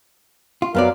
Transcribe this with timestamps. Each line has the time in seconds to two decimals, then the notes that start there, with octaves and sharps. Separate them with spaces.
0.62 F4
0.75 F#2 F#3 B3 A#4 D5 F5